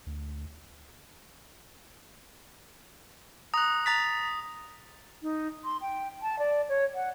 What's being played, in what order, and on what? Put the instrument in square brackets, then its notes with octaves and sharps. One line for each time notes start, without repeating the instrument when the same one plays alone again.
[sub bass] D2
[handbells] A#5 F#6 [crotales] D#6
[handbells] A#5 A6 B6
[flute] D#4
C6
G5
A5
D5
C#5
F#5